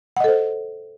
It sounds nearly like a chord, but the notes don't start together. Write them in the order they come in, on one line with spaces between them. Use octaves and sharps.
F#5 D#5 A4 C5